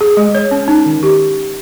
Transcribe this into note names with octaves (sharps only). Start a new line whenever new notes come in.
G#4
G#3
C#5
C#4
D#4
D#3
G4